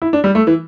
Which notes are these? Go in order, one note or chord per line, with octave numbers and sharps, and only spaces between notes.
E4
D4
G3
A3
E3